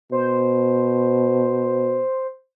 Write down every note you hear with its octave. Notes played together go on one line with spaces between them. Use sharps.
B2 C5